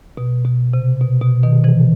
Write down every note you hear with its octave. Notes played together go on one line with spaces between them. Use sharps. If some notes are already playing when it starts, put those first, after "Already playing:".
B2
B2
C3
B2
B2
B2 D#3
C3 E3